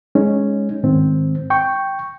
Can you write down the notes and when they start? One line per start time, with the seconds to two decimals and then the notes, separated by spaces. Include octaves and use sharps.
0.15 G#3 C#4 D#4
0.84 G#2 D#3 C4
1.50 G5 C#6